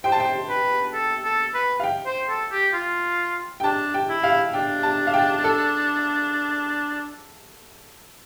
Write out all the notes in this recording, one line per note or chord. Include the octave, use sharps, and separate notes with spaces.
C5 G5
A5
G5
B4
A4
A4
B4
F5
G5
C5
A4
G4
F4
G5
D4 A5
G5
E4
F5
D4 G5
A5
F5
G5
A4